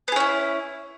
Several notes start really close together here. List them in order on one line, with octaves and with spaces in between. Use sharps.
B3 G#4 C#4 E4